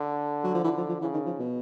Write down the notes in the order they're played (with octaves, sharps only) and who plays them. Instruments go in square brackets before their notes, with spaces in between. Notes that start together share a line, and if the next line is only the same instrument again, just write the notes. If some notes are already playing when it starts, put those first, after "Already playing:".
Already playing: [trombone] D3
[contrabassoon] F#3
F3
[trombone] D3 [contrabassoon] E3
[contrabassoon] F3
F3
[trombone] C#3 [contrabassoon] E3
[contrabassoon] D#3
F3
B2